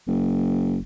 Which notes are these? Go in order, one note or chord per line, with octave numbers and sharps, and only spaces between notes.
F#1